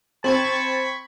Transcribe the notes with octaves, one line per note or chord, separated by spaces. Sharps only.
C4 A5 B5 C#6 G#6